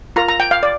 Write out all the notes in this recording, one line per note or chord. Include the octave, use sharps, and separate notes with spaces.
F4 A#4 A#5
A#5
G5
F5
D5